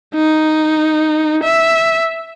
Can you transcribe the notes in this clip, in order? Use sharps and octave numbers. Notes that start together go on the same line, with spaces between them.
D#4
E5